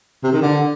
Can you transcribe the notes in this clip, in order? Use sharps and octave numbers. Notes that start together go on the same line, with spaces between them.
C3
D#3
D3